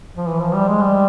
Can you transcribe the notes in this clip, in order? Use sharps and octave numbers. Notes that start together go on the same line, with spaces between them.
F3
E3
F3
G3
G#3
G3